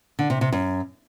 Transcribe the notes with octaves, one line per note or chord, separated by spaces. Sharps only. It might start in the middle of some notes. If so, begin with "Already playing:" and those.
D3
C3
C3
F#2